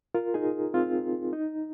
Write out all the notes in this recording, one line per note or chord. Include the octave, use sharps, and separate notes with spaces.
F4 A#4
D#4 G#4
C4 F4
D#4